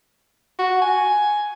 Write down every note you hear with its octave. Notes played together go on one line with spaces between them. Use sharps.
F#4
G#5